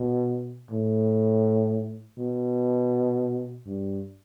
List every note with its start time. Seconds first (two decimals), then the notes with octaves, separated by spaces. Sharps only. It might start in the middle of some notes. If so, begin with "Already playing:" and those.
Already playing: B2
0.71 A2
2.18 B2
3.66 G2